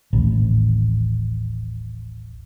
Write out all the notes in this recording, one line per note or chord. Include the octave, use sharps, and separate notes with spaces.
D#1 A1